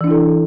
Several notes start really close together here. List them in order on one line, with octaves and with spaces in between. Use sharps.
E3 D4 E4 A4